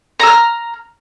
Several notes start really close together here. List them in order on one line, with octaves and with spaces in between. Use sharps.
A#5 E6 F6